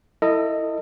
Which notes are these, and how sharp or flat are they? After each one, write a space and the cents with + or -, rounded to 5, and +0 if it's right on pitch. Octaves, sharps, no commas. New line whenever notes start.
E4 +0 A4 +35 D#5 -5